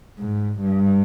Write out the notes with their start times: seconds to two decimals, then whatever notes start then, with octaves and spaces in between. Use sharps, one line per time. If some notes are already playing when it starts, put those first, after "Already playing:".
0.19 G#2
0.61 G2